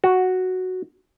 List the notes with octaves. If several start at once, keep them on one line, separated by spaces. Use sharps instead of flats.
F#4